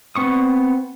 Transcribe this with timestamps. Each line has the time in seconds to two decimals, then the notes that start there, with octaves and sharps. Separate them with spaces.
0.16 B3 C4 C#6 D#6